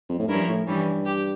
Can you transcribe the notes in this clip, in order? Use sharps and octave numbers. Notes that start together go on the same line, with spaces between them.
F2
A2
G2 F3 C#4 E4 A#4
A2
G2 E3 G3 C#4
G4